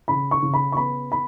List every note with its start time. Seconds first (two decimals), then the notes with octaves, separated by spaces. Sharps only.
0.08 C#3 B5
0.31 C#6
0.42 C#3
0.54 B5
0.72 C#6
0.76 B3 B5
1.12 B5